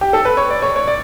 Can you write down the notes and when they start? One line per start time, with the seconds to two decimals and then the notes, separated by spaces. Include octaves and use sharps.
0.01 G4
0.13 A4
0.25 B4
0.37 C#5
0.51 D5
0.62 C#5
0.76 C#5
0.87 D5